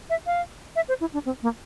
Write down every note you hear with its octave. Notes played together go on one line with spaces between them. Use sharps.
E5
F5
E5
C5
E4
D4
C4
A#3